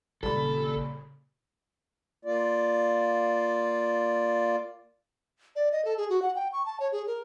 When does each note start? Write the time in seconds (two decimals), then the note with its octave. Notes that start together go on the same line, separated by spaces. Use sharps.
0.23 G#1 A#2 C#3 G3 A4 B5
2.25 A#3 F4 D5
5.56 D5
5.72 D#5
5.85 A4
5.97 G#4
6.10 F#4
6.22 F#5
6.35 G5
6.53 C#6
6.66 A5
6.80 C#5
6.92 G#4
7.07 A#4